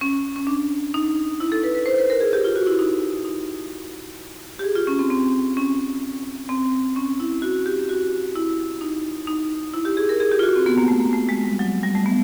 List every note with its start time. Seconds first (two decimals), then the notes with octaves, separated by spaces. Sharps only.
0.01 C#4
0.36 C#4
0.47 D4
0.94 D#4
1.40 E4
1.52 A4
1.63 B4
1.75 B4
1.86 C5
1.98 B4
2.10 A#4
2.21 G#4
2.33 G4
2.44 F4
2.56 F#4
2.67 E4
2.79 D#4
3.25 D#4
4.59 G4
4.64 G#4
4.75 F4
4.87 C#4
4.99 C4
5.10 C4
5.57 C#4
6.49 C4
6.96 C#4
7.20 E4
7.42 F#4
7.66 G4
7.89 F#4
8.36 E4
8.81 D#4
9.27 D#4
9.74 E4
9.85 G4
9.97 G#4
10.09 A#4
10.20 G#4
10.32 G4
10.39 F4
10.43 F#4
10.56 C4
10.66 B3
10.78 A#3
10.88 A3
11.00 A#3
11.13 A3
11.29 G#3
11.44 G3
11.59 F#3
11.83 G3
11.95 A3
12.06 B3